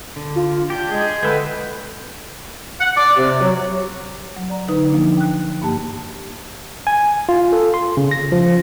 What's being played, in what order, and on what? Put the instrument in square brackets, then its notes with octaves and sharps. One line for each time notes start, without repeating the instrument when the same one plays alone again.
[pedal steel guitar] D3
[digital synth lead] F4
[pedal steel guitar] D4 G4 [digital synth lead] G6
[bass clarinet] G#3 [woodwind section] G#4
[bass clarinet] D3 [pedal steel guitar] G#4 E5 G5 [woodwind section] B4
[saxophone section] F#5
D5
C3
F#3
[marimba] F#3
D5 A#5
D3 D#4 B4
F3 A#3 D4
G5 F#6
G2 A#3 G4 A5
[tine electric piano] G#5
F4
A4
C6
C#3
A#6
F3